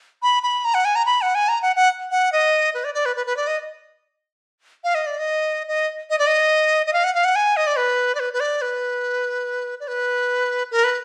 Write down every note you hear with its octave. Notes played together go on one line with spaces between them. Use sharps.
B5
B5
A#5
F#5
G#5
A#5
B5
F#5
G#5
A#5
F#5
F#5
F#5
D#5
B4
D5
D5
B4
B4
B4
D5
D#5
F5
D#5
D5
D#5
D#5
D#5
D5
D#5
D#5
F5
F#5
F5
F#5
G#5
D#5
D5
B4
D5
B4
B4
D5
B4
D5
B4
A#4
B4